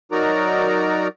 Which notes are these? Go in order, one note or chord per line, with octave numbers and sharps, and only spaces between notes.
F#3 D#4 F#4 A#4 D5 A#5